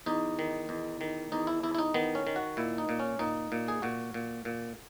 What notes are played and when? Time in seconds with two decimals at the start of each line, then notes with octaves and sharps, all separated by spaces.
0.06 E2 D#4
0.39 D#3
0.69 E2
1.01 D#3
1.32 E2 D#4
1.47 E4
1.63 E2 E4
1.75 E4
1.78 D#4
1.94 D#3 B3
2.15 C#4
2.27 D#3
2.36 F#4
2.57 A#2 E4
2.78 D#4
2.89 A#2
2.99 C#4
3.19 A#2 D#4
3.52 A#2
3.68 G#4
3.82 A#2 F#4
4.14 A#2
4.45 A#2